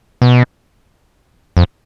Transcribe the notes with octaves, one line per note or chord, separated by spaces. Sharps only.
B2
F2